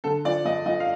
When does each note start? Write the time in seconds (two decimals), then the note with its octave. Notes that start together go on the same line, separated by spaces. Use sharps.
0.04 D3 A4
0.25 F3 D5
0.45 F2 D#5
0.66 F3 D#5
0.80 F5